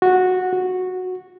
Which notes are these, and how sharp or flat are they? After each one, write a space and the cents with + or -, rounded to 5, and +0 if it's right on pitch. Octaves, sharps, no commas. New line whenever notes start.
F#4 -10
F#4 -10